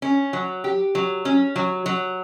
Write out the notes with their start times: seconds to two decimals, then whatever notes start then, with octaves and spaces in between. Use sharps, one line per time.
0.02 C#4
0.33 F#3
0.64 G4
0.95 F#3
1.25 C#4
1.56 F#3
1.86 F#3